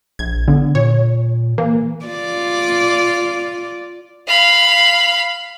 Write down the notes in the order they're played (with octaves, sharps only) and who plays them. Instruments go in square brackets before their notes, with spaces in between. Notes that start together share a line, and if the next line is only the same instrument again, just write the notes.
[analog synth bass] A#1 [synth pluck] G#6
[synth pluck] D3 [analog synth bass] B3
[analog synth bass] A#2 [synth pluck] C#5
[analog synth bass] E3 [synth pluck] A#3
[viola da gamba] F4 D5
[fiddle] F5 B5